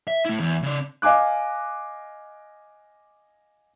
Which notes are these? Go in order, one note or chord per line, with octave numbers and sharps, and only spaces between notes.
E5
A3 E4
E2
C#3 D5
D#5 F5 G#5 D6 F#6